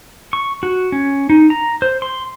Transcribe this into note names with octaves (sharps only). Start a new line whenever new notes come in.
C#6
F#4
C#4
D#4
A#5
C5
C6